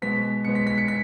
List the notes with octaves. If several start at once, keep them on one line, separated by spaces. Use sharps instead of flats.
B2 G#3 B3 B6
B2 G#3 B3 C#7
B6
B6
C#7
B6